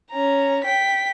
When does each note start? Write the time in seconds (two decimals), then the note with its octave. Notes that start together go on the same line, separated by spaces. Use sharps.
0.12 C#4 A#5
0.65 G5 B6